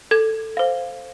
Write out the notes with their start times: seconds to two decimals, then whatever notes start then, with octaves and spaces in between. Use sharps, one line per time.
0.11 A4 G#6
0.57 C5 F5